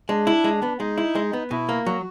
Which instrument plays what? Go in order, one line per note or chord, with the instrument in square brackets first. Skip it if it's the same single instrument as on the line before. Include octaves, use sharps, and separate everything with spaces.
[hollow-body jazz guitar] G#3 [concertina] D4
[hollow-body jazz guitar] E4
G#3
B3
[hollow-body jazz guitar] G#3 [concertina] D#4
[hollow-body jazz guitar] E4
G#3
B3
[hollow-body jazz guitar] B2 [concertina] E4
[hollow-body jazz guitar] A#3
[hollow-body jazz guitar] F#3 [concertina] F#4